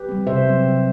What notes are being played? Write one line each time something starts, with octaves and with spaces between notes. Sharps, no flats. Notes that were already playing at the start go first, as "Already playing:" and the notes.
Already playing: G4 B4
G3 C4
C3 C5 E5
F#3 C4
C3